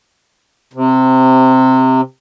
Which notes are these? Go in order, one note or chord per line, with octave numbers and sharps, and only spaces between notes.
C3